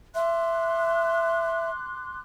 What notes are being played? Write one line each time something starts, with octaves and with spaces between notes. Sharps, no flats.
E5 C6 D6 F#6